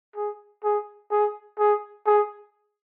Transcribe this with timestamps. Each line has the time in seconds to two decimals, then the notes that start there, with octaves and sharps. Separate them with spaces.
0.16 G#4
0.64 G#4
1.11 G#4
1.59 G#4
2.06 G#4